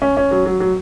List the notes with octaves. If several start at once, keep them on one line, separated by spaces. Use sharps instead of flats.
C#4
C#4
F#3
F#3
F#3